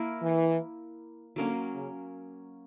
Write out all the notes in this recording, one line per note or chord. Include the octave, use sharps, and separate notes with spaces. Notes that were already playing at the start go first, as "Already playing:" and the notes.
Already playing: A#3 E4 A#4
E3
D3 F#3 A#3 C#4
C#3